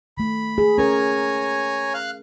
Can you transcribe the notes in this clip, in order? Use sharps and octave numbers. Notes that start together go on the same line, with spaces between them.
D#3 A3 B5
G#4
C#4 A#4 C#5 G#5 A#5
F5 F6 F#6